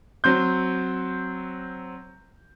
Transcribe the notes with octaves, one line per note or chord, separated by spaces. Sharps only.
F#3 C4 C6 G6